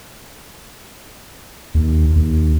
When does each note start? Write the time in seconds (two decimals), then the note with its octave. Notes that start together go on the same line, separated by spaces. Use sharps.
1.75 D#2
2.16 D#2